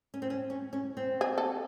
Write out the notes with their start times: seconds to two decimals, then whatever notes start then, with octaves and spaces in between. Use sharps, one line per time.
0.14 C#4
0.22 C4
0.30 C#4
0.50 C#4
0.73 C#4
0.97 C4
1.21 G#4
1.38 A4